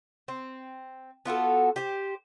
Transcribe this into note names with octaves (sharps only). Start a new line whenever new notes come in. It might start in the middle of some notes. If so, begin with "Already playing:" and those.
C4
B3 F4 F#4 A4
G4 C5